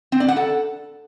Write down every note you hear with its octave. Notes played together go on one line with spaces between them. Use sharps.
C4
D5
F#5
A4